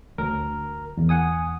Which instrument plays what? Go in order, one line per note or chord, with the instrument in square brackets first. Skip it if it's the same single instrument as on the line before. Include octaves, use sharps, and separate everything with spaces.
[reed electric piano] D2 [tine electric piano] A#4
[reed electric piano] E2
[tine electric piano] F#5 G#5 D#6